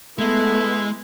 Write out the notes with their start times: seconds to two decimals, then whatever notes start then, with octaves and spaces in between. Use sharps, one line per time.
0.19 G#3 A3 B3 E4